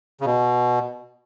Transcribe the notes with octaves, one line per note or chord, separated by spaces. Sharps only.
C#3
B2